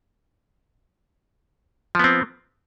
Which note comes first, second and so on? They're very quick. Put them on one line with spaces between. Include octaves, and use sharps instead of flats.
F3 B3 C4